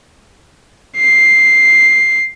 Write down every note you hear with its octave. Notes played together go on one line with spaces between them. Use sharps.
C7